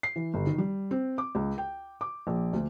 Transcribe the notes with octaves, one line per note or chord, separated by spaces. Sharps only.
C7
E3
G1
D#3
G3
C4
D6
C#2
G5
D6
A#1
D2